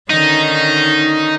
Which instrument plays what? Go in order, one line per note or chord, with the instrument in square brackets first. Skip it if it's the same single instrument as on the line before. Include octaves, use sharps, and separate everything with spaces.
[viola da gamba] D3 D#3 C#4 [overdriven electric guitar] D#4